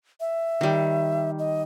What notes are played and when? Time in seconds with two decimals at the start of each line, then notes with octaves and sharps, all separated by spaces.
0.20 E5
0.61 D#3 G3
1.39 D#5